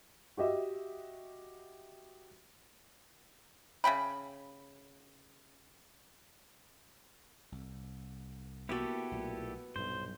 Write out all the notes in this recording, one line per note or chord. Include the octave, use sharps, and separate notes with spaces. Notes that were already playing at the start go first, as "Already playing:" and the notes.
F#4 G4 D#5 E5
C#3 E5 G5 B5
C2
A#3 B3 E4 F#4 G4 A4
B1 A#2 A3
B1 G2 A#2 F#3 C5